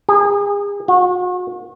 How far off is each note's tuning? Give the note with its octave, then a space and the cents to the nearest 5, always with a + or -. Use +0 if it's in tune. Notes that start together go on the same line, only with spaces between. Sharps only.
G#4 -40
F#4 -40